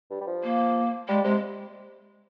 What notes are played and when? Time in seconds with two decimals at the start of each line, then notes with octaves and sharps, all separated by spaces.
0.10 G2
0.21 G3
0.27 F3
0.44 A#3
1.08 G3 G#3
1.24 C3 G#3